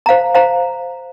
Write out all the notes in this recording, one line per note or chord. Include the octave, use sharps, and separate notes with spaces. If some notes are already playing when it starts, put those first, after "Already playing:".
C5 F5 A#5
C5 F5 A#5